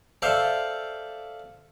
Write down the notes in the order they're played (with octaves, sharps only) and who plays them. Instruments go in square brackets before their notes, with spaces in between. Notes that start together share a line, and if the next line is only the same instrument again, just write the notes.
[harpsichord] A4 C5 D5 E5 F5 G5